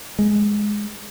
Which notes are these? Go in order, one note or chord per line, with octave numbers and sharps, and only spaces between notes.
G#3